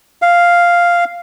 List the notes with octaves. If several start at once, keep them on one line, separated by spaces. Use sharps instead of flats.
F5